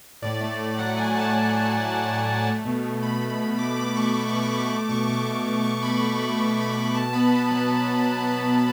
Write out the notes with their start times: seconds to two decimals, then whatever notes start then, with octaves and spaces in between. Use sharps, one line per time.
0.22 A2 D5
0.41 A3
0.59 A2
0.78 F#3 F#5
0.96 A2 G#5
1.15 A3 A5
1.34 A2
1.53 F#3
1.71 A2
1.90 A3
2.09 A2
2.27 F#3
2.46 A3
2.65 B2
2.83 B2
3.02 A3 B5
3.21 A3
3.39 B2
3.58 B2 D6
3.77 A3 D6
3.95 A3 C#6
4.14 B2 D6
4.28 B2 C#6
4.43 D6
4.52 A3 C#6
4.70 A3 D6
4.89 B2 C#6
5.08 B2 D6
5.26 A3 D6
5.45 A3 D6
5.64 B2 C#6
5.83 B2 B5
6.01 A3
6.20 A3
6.38 B2 C#6
6.57 B2 B5
6.75 A3 B5
6.95 B2 A5
7.13 B3 B5
7.32 B2
7.51 F#3
7.69 B2
7.88 B3
8.07 B2
8.25 F#3
8.44 B2